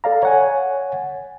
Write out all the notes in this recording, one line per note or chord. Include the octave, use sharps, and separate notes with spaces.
A4 D5 F5 A#5
C#5 F#5 G#5